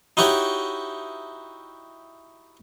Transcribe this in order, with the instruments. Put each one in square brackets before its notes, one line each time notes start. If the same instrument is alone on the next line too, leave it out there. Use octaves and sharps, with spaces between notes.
[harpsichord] D#4 E4 F#4 G4 C#5